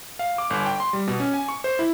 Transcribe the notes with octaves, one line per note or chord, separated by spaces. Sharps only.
F5
D6
G1
G5
C6
G3
B2
C#4
G#5
C#6
C5
E4